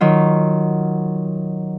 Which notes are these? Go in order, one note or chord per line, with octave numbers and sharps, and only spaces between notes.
D#3 F#3 F4